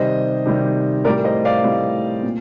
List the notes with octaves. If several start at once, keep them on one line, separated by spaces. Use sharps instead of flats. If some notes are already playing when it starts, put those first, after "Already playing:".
Already playing: C3 D#3 G3 C5 D#5
C3 D#3 G3
A2 G3 A#4 D5
C5 D#5
D5 F5
A2 G3
A#2